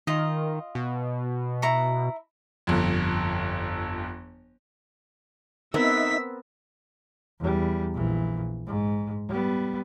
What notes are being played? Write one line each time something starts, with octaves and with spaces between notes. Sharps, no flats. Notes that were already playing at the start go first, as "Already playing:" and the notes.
D#3 F4 D#5
B2
E4 A#5 C#6
G1 F2
B3 C4 D#4 A#4 E5 E6 B6
E2 G3
A#1 E3
G#2
G3 B3